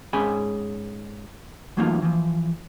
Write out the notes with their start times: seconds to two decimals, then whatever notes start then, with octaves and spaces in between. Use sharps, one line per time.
0.13 G#2 C#4 G#4 G#5 B5
1.77 E3 F#3 A3 A#3 D#4 F4
2.02 E3 F3